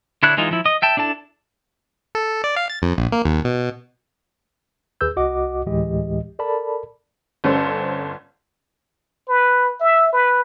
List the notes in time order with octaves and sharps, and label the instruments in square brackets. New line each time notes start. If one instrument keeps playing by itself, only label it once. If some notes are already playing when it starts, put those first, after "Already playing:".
[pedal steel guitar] D3 D4 E4 C#5 F#6
E3 G#3 D#4 F4
F3 E4
D#5 D#6
E5 G5 A5
D4 E4 A4 A5
[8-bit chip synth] A4
D5
F5
A6
F2
A#1
A#3
D#2
B2
[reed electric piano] D#2 G#4 B4 E6 G6
C2 F#4 D#5 F#5 D6
D2 A2 E3 G#3 G4 D#5
A4 A#4 D5 A5 B5
[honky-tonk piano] G1 C#4 A4 C5
[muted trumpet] B4
E5
B4